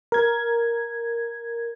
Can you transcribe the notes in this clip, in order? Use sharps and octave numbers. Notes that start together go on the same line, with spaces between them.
A#4 G#6